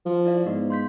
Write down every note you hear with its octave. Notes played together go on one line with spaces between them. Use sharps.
F3
E4 D5 F5
G#2 B3 D#5
C6 G6 B6